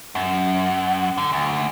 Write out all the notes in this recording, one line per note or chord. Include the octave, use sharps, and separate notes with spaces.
F#2
D3
D2